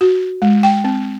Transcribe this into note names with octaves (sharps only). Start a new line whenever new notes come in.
F#4
G#3
G5
C4